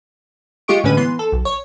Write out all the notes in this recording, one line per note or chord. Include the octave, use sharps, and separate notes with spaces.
G#3 F4 G4 D#5 C#6 D7
A2 D3 G#3 C#4 B4 D#7
E3 B3 C6
A4
B1
C#5